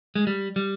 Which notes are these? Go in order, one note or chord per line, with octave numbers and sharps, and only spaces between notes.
G#3
G3
G3